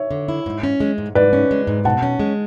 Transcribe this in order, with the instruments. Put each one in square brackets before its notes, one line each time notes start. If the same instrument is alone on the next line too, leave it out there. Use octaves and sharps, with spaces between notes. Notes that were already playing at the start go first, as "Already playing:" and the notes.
Already playing: [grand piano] C#5 E5
[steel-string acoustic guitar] D3
E4
G#2
C#4
G#3
G#2
[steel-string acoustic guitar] G#2 [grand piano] B4 D5
[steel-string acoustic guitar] C#4
G#3
G#2
[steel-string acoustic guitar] B2 [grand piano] F#5 A5
[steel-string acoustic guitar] C#4
G#3